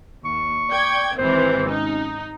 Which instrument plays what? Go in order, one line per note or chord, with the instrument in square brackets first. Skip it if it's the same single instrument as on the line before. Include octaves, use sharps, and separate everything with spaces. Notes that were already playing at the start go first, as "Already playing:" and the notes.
[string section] D#2 [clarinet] C#6
[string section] D5 G5 G#6
[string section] G#1 C3 E3 [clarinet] C5
[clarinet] C#4 [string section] D#4